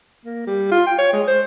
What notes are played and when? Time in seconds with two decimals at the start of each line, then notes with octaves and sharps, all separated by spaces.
0.25 A#3
0.47 G3
0.71 F4
0.86 G5
0.98 C#5
1.13 G#3
1.28 C5